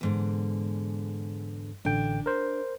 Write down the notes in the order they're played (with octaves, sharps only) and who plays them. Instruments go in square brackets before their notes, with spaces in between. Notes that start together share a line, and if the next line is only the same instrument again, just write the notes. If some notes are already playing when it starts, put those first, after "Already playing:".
[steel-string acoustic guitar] E2 G#2 D3
[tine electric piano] A1 D3 G5 [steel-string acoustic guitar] D4
[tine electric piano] A#4 C5